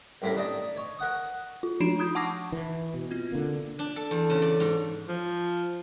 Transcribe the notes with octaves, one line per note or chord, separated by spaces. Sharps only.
C2 A2 C#4 A#4 B5
D4 D#4 D5 D#5
C#5
A#4 F#5 D#6
F4
F3 D4 D#4 C7 D7 E7
B5 D#6 G6 G#6
F#5 A5 C#6 D6 A#6 C7
E3
B2
C4 F4 G#6
D3 A#3
D4
A4
E2
C#3
D5
G#2
F3